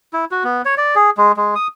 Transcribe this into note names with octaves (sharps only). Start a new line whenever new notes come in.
E4
F#4
B3
C#5
D5
G#4
G#3
G#3
D#6